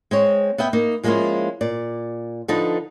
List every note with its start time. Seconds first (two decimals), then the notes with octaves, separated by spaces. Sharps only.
0.11 G#3 C4 C#5
0.58 B3 D#5 E5 G5
0.73 A#3 D#4
1.03 F3 G#3 A#3 C#4 E4 F4
1.61 A#2 D5
2.48 D3 F3 D#4 A4 B4 A5